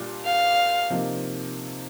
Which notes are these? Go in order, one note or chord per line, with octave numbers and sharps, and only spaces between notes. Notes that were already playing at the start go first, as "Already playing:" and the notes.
Already playing: A#2 G3 D4 F4
F5
C3 F3 A#3 D#4